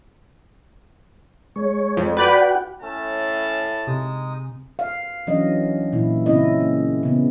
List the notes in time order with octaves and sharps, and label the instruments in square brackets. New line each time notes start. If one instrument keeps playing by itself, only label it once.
[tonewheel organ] G#3 C#5
[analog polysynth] F2
[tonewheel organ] F#4 F#5 G5 [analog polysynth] B4 D5 B5
[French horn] A2 [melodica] A3 C#4 [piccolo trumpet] A5
[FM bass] C3 [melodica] G#3 D#4 D#6
[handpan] F5
E3 F#3 C#4 D4 D#5
A#2 E3 E4
C#3 C4 C#4 E4 D#5
A#3
C#3 B3